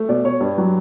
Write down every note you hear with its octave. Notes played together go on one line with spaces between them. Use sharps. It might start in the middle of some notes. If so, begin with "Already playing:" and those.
Already playing: A3
B2 D5
B2 C#5
G2
F#3